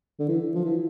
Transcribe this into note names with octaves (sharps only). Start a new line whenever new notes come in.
D3
E3
F3
E3